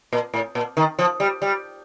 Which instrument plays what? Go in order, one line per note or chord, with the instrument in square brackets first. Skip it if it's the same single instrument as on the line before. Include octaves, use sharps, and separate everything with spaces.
[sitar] A#2
A2
A#2
D#3
F3
G3
G3